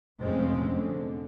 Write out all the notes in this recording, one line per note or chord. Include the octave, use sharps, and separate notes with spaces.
F1 F3 G#3 C4 C#4
D3